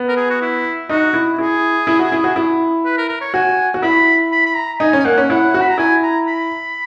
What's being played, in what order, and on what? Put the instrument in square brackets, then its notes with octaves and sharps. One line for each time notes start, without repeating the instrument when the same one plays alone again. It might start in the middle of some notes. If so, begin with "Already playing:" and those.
Already playing: [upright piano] B3
[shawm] A#4
G#4
F#4
E4
[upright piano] D#4 [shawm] F#4
[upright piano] E4
[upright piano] E4 [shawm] G#4
[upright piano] E4
F#4
E4
F#4
E4
[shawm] B4
A#4
A#4
C#5
[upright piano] F#4 [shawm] G#5
[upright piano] F#4
[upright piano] E4 [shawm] B5
[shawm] B5
B5
A#5
[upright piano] D#4 [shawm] G#5
[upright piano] C#4
[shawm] G#5
[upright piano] A#3 [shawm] F#5
[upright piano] C#4
[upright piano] E4 [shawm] F#5
[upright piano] F#4
[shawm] B5
A#5
[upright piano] E4 [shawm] G#5
[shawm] A#5
B5